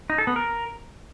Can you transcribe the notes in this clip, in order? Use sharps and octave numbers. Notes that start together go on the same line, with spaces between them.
D#4
A4
B3
A#4